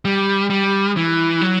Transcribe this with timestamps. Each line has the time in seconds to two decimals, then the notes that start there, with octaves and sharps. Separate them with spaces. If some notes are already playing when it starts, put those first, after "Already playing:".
0.05 G3
0.50 G3
0.97 E3
1.41 F#3